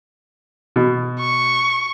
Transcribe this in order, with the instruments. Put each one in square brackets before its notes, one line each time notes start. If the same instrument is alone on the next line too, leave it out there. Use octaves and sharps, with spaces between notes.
[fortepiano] B2
[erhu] C#6